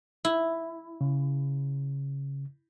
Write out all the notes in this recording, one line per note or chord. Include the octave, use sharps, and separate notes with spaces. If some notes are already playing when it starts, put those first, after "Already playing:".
E4
C#3